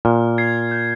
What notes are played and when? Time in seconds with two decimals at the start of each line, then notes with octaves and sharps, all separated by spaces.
0.05 A#2 F6
0.38 G#6 C7
0.71 G6